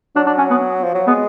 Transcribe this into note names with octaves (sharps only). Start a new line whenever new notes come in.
F#3 D4
D4
C#4
B3
F3
F#3
G#3 B3